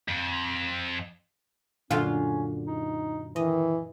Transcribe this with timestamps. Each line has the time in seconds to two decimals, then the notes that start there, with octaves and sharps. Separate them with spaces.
0.08 F2
1.91 F#2 A#2 D3 C#4 F4
2.67 D#4
3.36 D#3 E3 D#5